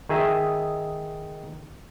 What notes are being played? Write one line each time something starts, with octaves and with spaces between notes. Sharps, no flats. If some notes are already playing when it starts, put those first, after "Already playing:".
D#3 G#4 D#5 E5